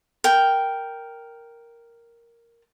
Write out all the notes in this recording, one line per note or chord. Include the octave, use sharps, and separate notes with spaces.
A#4 G5